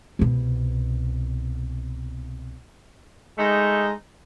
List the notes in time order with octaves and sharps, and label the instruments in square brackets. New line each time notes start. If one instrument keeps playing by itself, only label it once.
[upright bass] C2 B2
[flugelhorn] G#3 [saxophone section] A3 D#4